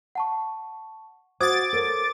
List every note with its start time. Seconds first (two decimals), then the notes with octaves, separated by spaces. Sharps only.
0.15 F#5 A5 C#6
1.40 F#4 C5 F5 F#5 D6 D#6 G#6 A6
1.73 A4 A#4 C#5